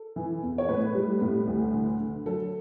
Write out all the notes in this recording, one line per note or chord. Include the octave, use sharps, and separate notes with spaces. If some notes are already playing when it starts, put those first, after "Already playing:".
Already playing: A4
E3
E2
C#5
A2 B4
G3
A2
D2
D3
D3
F#3 A4